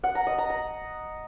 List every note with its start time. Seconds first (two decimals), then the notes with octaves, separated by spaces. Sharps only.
0.04 F#5
0.15 A#5
0.27 D#5
0.38 A#5
0.50 A#5